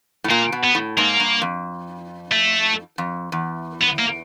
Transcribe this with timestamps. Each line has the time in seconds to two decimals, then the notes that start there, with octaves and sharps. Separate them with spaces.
0.24 A2
0.30 A#2 A#3
0.52 B2
0.64 B3
0.75 A2
0.97 G#2 A#3
1.20 G2
1.42 F2
2.32 A3
2.98 F2
3.32 E2
3.83 B3
3.99 A#3